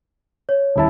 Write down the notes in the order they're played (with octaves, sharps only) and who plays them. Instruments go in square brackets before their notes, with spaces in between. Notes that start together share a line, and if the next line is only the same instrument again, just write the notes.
[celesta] C#5
[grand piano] D#1 E4 A5